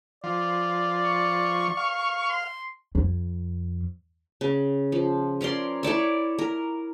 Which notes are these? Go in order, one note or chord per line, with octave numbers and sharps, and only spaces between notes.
F3 D5
C#6
F5
C6
F2
C#3
F3
C#4 A#4 D5 C6
E4 C#5 D5 E5
A#4